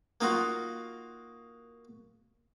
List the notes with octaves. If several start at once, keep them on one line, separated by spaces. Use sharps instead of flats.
A#3 D#4 F4 F#4